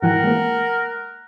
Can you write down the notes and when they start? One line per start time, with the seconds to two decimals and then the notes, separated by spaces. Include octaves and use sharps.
0.02 G#2 E3 A#4 F#5 G5
0.24 G#3 A#3